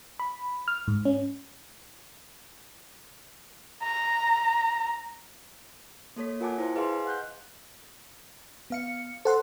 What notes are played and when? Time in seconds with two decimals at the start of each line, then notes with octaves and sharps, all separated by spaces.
0.20 B5
0.68 F6
0.87 G#2
1.05 C#4
3.83 A#5
6.16 A#3 A4 C#5 B6
6.40 F4 A#4 F#5 G#5 A5 D6
6.58 E4 C5
6.75 G#4 B4 D#5 F5 G#5 C6
7.05 F#5 F#6 G6
8.70 B3 F5 C#7
9.25 A4 C5 F#5 C6